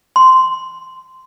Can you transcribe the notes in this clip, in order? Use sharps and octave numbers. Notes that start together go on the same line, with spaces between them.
C6